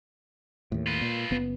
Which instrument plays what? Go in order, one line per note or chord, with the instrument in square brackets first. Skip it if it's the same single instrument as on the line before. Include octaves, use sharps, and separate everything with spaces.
[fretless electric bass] D#2 A2
[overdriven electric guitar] F4 B4
[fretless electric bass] A#2
F#1 B3